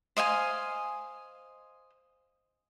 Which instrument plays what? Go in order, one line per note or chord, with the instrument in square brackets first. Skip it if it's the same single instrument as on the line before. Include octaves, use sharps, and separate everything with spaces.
[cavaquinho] C5 D#5 F5 G#5